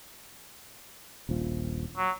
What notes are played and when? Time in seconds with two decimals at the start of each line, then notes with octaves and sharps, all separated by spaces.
1.29 D#1 A#1 F3
1.97 F#3